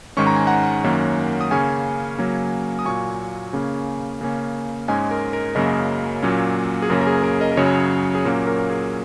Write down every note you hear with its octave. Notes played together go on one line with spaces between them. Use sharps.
G#2 D#3 G#3 C#4 C#6
A#5
G#5
F#5 A#5
F#2 D#3 A#3 C#4
D#6
C#3 A#3 C#4 G#5 C#6
C#3 F#3 A#3 C#4
D#6
A#2 F#3 A#3 G#5 C#6
C#3 A#3 C#4
C#3 A#3 C#4
G#2 G#3 C#4 D#5 G#5
A#4
A#4
F#2 C#3 F#3 A#3 C#4 A#4 D#5
A#2 F#3 A#3 C#4
G#4
F#2 C#3 A#3 C#4 A#4
A#4
G#4
A#4
A#4 D#5
A#4
F#2 C#3 F#3 C#4 G#4 C#5
G#4
A#2 F#3 A#3 C#4 A#4
A#4
G#4